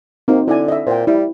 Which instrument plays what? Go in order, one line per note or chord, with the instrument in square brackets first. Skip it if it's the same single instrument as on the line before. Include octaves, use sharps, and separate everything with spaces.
[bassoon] A#3 [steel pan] C4 D#4 F#4
[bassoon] D3 [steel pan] E4 D5 G#5
[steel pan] D#5 E5
[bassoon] A#2 [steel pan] C5 G5
[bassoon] G3 [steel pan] E4